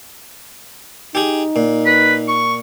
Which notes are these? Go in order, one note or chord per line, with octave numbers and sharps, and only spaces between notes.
D#4 G4 G#4
A#2
B4
C#6